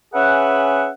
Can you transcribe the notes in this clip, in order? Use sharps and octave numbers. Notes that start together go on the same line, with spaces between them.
C#4 G#4 B4 E5 F#5